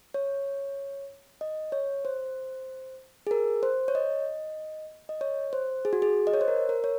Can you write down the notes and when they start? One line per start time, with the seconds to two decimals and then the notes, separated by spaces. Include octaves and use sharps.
0.14 C#5
1.41 D#5
1.72 C#5
2.05 C5
3.27 G#4
3.31 A#4
3.63 C5
3.88 C#5
3.95 D#5
5.09 D#5
5.21 C#5
5.53 C5
5.85 G#4
5.93 F#4
6.02 G#4
6.27 D#5
6.34 C#5
6.41 C5
6.48 A#4
6.69 A#4
6.84 C#5